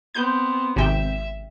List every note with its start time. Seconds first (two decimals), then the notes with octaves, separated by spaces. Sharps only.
0.14 B3 C4 G6
0.76 G#1 C3 E5 G5